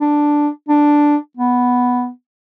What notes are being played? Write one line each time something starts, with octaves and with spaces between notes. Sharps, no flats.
D4
D4
B3